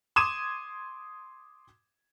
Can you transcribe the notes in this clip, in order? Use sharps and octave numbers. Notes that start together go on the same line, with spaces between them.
C6 D6 D#6 G#6 D#7 E7